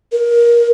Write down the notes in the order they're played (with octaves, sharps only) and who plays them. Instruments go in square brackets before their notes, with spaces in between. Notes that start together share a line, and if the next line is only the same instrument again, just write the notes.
[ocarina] A#4